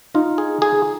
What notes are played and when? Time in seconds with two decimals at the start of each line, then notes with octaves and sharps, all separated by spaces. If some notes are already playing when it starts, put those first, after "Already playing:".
0.14 D#4 F4
0.38 G#4
0.62 G#4